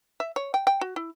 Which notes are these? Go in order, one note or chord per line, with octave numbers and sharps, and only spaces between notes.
E5
C#5
G5
G5
F#4
E4